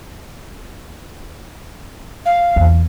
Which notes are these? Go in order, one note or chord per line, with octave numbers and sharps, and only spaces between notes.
F5
E2